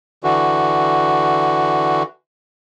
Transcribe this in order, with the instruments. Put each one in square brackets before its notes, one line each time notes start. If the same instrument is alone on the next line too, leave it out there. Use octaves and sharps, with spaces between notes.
[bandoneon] D3 E3 F#4